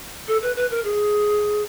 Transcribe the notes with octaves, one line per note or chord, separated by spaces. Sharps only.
A4
B4
B4
A#4
G#4